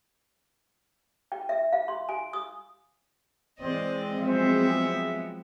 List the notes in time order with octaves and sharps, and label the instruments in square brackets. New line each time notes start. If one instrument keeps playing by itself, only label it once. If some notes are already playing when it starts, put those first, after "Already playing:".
[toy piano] G5
E5
F5
C6
G#5
D#6
[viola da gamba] E3 D5 D#5 [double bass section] G#3 C4 [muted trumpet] C5
[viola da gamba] F3 F#3 B3 [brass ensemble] G#4 E5 [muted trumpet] C5